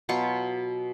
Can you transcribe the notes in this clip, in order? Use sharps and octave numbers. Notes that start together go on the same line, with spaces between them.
B2 F#3 F4 C#6